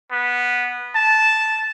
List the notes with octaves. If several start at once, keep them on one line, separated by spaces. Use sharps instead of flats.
B3
A5